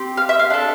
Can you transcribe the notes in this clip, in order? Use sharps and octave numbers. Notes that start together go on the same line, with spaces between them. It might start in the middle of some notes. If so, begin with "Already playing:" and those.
Already playing: C4 G4
F5
E5
F5
D4 A4